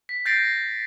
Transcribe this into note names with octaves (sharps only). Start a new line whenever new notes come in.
B6
G6 A6 A#6 C7 D7